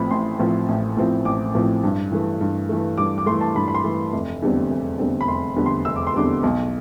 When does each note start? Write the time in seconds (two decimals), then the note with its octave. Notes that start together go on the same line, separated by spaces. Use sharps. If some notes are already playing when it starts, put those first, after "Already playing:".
Already playing: A1 A2 F3 C4 B5
0.11 A1 C6
0.39 A2 F3 C4
0.69 A1
0.97 A2 F3 C4
1.25 A1 D6
1.55 A2 F3 C4
1.84 G2
2.12 E3 A3
2.41 G2
2.69 E3 A3
2.98 G2 D6
3.18 D6
3.26 A3 C6
3.31 E3
3.41 A5
3.56 G2 B5
3.68 B5
3.75 C6
3.84 E3 A3
4.13 F1
4.42 E2 D3 G3 C4
4.70 F1
4.99 E2 D3 G3 C4
5.21 B5
5.28 F1 C6
5.56 E2 D3 G3 C4
5.66 C6
5.85 F1 E6
5.96 D6
6.07 C6
6.14 E2 D3 G3 C4 D6
6.43 B1